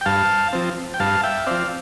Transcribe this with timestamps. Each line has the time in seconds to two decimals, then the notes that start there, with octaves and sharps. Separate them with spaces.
0.01 G5
0.06 G2 F5 A5
0.53 F3 C4
0.94 G5
1.00 G2 F5 A5
1.24 E5 G5
1.47 F3 C4 D5 F5